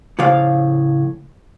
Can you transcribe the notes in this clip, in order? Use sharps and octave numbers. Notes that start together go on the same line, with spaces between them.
A2 C#3 F3 D5 F5